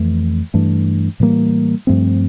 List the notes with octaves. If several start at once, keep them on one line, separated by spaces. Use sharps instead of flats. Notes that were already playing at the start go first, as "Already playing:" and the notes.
Already playing: F2 E3 A3
G2 E3 A3 D4
A2 E3 G3 A#3
G2 F3 A3 C4